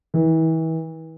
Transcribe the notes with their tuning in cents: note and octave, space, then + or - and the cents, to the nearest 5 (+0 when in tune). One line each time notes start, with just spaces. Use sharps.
E3 -35